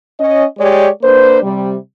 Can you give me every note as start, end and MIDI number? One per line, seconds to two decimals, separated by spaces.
0.19 0.45 61
0.19 0.45 75
0.58 0.88 56
0.58 0.88 67
0.58 0.88 73
0.58 0.88 74
1.02 1.38 58
1.02 1.38 62
1.02 1.38 71
1.02 1.38 72
1.42 1.75 48
1.42 1.75 55